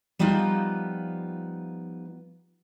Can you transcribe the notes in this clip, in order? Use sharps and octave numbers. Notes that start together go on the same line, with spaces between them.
F3 G3 B3 D#4 F4